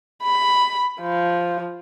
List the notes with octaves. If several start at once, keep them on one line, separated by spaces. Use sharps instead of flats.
B5
F3